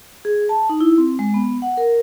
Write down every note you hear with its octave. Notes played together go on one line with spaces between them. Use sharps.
G#4
A5
D#4
E4
C4
G#3
B3
F#5
A#4